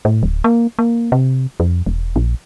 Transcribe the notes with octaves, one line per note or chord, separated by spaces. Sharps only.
A2
D1
A#3
A#3
C3
F2
E1
A#1